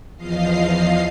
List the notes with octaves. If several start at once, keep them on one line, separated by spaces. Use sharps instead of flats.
E2 F3 D#5 F5 C7